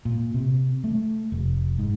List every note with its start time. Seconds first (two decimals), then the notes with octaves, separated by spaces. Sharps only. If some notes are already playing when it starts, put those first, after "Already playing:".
0.05 A#2
0.34 C3
0.84 A3
1.32 F1
1.79 G#2